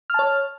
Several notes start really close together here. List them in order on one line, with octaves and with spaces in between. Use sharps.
F6 A5 C#5